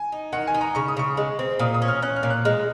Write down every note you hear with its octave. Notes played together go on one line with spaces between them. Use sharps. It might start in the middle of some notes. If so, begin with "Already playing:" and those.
Already playing: G#5
D#4
D#3 F#5
G#5
D#4
A#5
C#3 C#6
D#6
C#3 C#6
G#3
C4
A#2 D#6
D#6
C#4
F6
C#4 F#6
F6
A#2
F#6
G#3 F6